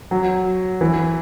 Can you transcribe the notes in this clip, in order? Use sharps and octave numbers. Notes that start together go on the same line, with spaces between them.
F#3
E3